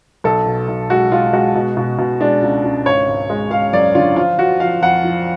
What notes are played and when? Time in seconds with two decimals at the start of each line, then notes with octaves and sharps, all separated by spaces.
0.24 B1 A4
0.46 B2
0.68 B1
0.90 G#3 F#4
1.12 G#3 F4
1.33 G#3 F#4
1.55 B2
1.77 B2
1.98 B2
2.21 G#3 D4
2.42 C#2
2.64 C#2
2.86 G#1 C#5
3.08 G#1
3.30 G#3
3.51 G#3 F5
3.73 F#2 D5
3.95 D3 F4
4.16 F3 F4
4.38 F3 F#4
4.60 F3 F5
4.82 F2 F#5
5.04 F3